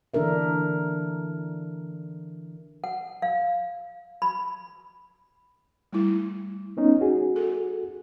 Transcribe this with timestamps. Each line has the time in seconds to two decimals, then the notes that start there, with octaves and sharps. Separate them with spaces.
0.14 D3 E3 D4 A4 A#4 E5
2.84 F#5
3.22 F5
4.22 B5
5.93 G3 A3 E4
6.77 B3 C#4 D#4
7.01 F#4 G#4
7.36 A4